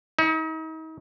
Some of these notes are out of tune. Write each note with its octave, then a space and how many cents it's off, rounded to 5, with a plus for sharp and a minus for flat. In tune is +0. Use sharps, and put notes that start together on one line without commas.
D#4 +40